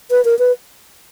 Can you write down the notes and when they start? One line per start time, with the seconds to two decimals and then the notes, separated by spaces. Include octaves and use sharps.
0.11 B4
0.25 A#4
0.39 B4